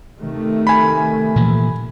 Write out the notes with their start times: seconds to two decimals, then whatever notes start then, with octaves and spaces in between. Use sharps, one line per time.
0.19 C3 D#3 A3
0.67 G#5 B5
1.36 A#2 E3 F3